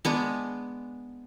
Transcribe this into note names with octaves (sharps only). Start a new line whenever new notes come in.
G#3 B3 D4